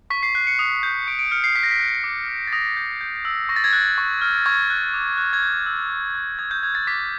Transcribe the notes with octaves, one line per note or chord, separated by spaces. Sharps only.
C#6 B6
C7
F#6 C7
C#7
D#6
G6
C#6 D7
D7
F6 C#7
C7
D#6 B6
A#6
B6
F#6
D6
F6
A6
D#6 A#6
G6
G6
E6
C#6 A#6
A6
G#6
F#6 A6
C#6
F6
C#6 G#6
F#6
D6
F#6
G#6
G6
E6
D6
F#6
D#6 G#6
G6
F#6 G#6
A6
D6 B6